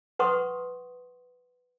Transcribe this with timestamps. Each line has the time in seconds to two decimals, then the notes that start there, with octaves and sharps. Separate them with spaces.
0.19 B4 F#5 C6 C#6 D#6